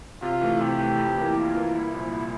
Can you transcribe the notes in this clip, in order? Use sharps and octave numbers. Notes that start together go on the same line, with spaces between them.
C3 F4
E3 A3
C3 G4
E3 A3
F2
E3 A#3 E4 A#4
F2 F4
E3 A#3 E4 A#4
C2 E4
A#2 F3
C2